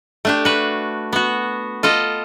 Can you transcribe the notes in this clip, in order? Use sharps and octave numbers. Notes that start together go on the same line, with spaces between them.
A3 D4 G4
F#4 B4
B3 F#4
F4 A4 D#5